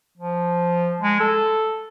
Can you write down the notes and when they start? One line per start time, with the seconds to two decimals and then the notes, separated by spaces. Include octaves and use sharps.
0.17 F3
1.00 G#3
1.20 A4